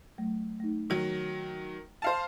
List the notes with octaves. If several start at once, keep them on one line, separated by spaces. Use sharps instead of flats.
F#3 A3
A3 D#4
D#3 F#3
C5 F5 A5